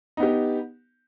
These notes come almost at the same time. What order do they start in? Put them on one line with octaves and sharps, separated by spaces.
D#4 B3 G4